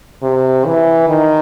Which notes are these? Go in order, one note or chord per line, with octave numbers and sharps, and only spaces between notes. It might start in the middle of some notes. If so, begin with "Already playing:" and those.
C3
E3
D#3